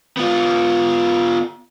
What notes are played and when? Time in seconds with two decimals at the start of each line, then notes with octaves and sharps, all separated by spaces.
0.17 B3 F4